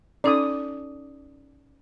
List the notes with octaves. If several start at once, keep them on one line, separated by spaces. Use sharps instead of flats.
C#4 D#4 A4 D5 D#6